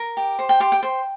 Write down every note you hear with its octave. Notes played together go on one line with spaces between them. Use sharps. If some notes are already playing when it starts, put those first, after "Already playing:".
Already playing: A#4
G4
C5
G5
G4 C6
G5
C5